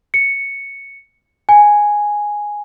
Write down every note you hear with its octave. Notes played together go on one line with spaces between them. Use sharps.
C#7
G#5